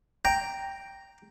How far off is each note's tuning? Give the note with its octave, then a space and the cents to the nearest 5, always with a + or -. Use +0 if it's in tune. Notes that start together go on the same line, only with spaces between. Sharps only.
G5 +0 A#5 +0